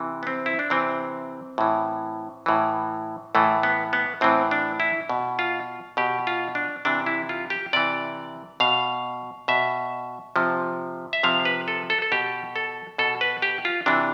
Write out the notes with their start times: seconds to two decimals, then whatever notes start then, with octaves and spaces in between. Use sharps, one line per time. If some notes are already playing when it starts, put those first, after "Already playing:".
Already playing: C3 E3
0.23 B3
0.27 C4
0.46 E4
0.59 D4
0.70 C3 E3 C4
1.58 A2 E3
2.46 A2 E3
3.35 A2 E3 A3
3.63 B3
3.93 B3
4.21 A2 E3 C4
4.51 D4
4.80 E4
5.09 B2
5.39 F4
5.97 B2 G4
6.27 F4
6.55 D4
6.85 C3 E3 D4
7.06 E4
7.29 F4
7.50 G4
7.73 C3 E3 D5
8.60 B2 F5
9.48 B2 E5
10.36 C3 F3
11.13 E5
11.23 C3 F3 F5
11.45 B4
11.68 A4
11.90 A4
12.02 A4
12.12 B2 G4
12.56 A4
12.98 B2 A4
13.21 B4
13.42 G4
13.65 F4
13.86 C3 E3 D4